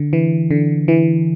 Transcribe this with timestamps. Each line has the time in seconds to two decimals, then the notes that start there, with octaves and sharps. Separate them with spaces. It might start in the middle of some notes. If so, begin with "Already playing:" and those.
Already playing: D3
0.13 E3
0.51 D3
0.88 E3